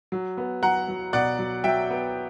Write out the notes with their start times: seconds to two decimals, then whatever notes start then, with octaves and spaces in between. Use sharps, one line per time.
0.12 F#3
0.37 B3
0.63 F#3 F#5 A#5
0.88 F#3
1.13 B2 D5 F#5
1.39 F#3
1.64 F#3 E5 G5
1.90 B3